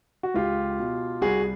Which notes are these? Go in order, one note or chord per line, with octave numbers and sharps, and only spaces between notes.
F#4
C#2 F4 G4
B2
C2 F#4 G#4